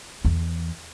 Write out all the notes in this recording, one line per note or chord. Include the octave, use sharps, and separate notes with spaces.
E2